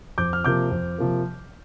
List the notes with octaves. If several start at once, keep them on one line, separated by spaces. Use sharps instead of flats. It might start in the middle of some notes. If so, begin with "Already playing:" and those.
F2 D6 G6
F6
C3 F3 A#3 D6 G6
F2
C3 F3 A#3